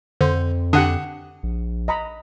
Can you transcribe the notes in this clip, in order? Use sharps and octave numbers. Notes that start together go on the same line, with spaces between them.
F2 D3 C5
D3 D4 G4 F#5 D#6
A#1
D#5 A#5 B5